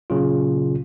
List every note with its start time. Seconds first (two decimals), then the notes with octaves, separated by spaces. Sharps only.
0.10 A#2 C#3 F#3 F4